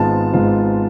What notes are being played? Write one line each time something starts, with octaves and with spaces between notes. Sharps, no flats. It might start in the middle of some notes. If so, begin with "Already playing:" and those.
Already playing: G#1 G#2 G#3 B3 F4 A5
G#1 G#2 G#3 B3 F4